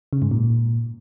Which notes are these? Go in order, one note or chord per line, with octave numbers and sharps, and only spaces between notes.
C#3
G#2
A#2